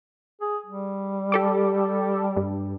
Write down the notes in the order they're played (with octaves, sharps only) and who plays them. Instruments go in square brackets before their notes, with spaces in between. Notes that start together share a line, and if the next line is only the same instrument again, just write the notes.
[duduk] G#4
G3
[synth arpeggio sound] G4 A4 D6
G2